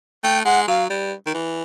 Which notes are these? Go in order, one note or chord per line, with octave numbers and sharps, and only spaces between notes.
A3 G5
G#3 F#5
F#3 F5
G3
D#3
E3